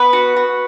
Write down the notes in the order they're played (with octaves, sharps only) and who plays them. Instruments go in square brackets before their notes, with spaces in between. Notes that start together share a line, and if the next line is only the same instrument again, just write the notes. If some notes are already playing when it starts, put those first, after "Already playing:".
Already playing: [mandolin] B3 B4
F#4
F#4